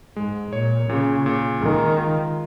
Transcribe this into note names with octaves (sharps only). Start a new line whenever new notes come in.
G#2 G#3
A#2 C#5
A#2 C#3
A#2
D#3 G#3
F4